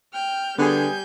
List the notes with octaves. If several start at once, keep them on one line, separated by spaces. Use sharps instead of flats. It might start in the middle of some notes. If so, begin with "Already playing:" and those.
G5 F6 G6
D3 G3 B3 G#4 G#5 G6